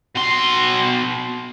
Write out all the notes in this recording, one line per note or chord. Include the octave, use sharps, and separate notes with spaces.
B2 C6